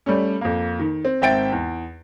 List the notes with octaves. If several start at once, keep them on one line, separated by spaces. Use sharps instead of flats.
G3 A3 C#4
F2 A#3
D#3
C4
G#1 C4 E5 G5 A6 D7
E2